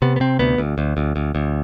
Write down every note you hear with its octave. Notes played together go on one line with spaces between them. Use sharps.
C3 B3
B3
C3 C4
D2 B3
D2
D2
D2
D2
D2